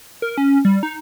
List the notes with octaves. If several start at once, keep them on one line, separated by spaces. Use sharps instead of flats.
A#4
C#4
G3
D#4